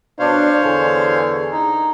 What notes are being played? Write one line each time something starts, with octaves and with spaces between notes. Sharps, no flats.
B2 D4 C5 C#5 F5
E2 D3 G#4
D#4